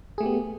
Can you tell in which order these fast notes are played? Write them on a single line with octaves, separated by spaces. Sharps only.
G#4 A3 G4 B3